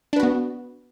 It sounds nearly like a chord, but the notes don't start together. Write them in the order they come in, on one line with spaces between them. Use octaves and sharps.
D4 B4 F#4 B3